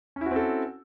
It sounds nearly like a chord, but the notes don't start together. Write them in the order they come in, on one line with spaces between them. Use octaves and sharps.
C#4 E4 F#4 C4 A4